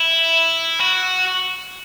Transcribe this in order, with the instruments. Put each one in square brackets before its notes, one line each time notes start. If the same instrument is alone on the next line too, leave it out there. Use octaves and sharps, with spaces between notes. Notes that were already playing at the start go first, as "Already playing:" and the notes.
Already playing: [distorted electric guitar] E4
F#4